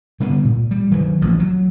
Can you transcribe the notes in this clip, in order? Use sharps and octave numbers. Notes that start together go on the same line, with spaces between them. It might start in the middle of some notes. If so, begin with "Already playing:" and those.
D3 G3 G#3 B3
A#2
G3
G2 D#3 F#3
A1 F3
F#3